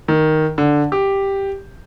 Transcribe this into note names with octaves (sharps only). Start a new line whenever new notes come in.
D#3
D3
G4